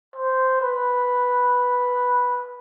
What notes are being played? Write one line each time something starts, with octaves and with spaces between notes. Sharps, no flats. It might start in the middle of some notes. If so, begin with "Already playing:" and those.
C5
B4